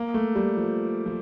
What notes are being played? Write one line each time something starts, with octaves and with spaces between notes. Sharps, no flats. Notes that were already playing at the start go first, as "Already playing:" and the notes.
Already playing: A#3
A3
G3
F3
F3